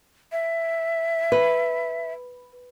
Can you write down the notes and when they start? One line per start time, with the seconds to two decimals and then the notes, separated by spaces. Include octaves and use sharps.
0.32 E5
1.32 B4